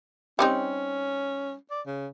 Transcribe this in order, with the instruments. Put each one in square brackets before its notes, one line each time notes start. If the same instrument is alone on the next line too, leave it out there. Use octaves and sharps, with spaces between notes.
[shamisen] G3 C4 D#4 [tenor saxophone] C#4
[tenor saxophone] D5
C#3